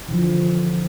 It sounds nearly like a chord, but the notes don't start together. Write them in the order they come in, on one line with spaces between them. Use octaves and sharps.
E3 D3 F3